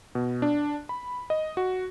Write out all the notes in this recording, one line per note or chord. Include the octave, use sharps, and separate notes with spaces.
B2
D4
B5
D#5
F#4